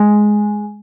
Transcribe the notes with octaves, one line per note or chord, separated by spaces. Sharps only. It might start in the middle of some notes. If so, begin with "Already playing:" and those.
Already playing: G#3